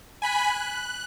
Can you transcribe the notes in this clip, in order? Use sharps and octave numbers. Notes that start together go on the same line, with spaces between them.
G#5 B5 F#6 B6
F#6